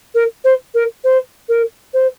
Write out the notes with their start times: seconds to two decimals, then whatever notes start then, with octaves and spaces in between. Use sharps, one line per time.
0.14 A#4
0.44 C5
0.74 A#4
1.04 C5
1.48 A#4
1.93 C5